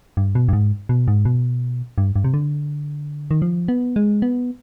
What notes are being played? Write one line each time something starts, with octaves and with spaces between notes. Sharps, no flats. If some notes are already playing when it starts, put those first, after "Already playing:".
G2
B2
G2
G#2
B2
G#2
B2
G2
G2
C3
D3
D#3
F3
B3
G#3
B3